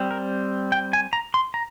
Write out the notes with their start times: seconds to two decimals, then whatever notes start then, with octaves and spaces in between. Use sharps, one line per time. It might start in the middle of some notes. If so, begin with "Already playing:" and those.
Already playing: G3 C4
0.11 A#4
0.72 G5
0.93 G#5
1.13 A#5
1.34 C6
1.54 A#5